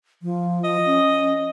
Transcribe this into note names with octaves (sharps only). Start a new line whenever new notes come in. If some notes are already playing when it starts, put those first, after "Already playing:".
F3
D#5
C#4